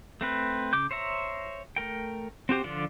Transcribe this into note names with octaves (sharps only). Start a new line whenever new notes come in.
A3 C4 B4
C#3 D6 G6
C5 C#5 E5 A#5
A3 A#4 G5
C4 F#4 G4 C5
D3 F3 D4 F4 D5